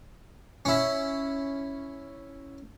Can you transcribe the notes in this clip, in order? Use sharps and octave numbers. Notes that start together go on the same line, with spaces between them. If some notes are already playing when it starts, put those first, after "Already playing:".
C#4 E4